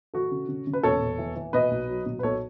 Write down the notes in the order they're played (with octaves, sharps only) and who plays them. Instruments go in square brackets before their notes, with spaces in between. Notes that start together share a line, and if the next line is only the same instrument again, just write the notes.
[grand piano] E3 F#4 A4
C#3
C#3
C#3
B4
E1 A4 C#5
E1
E3
E3
B2 B4 D#5
B1
F#3
B2
B4
B1 A4 C#5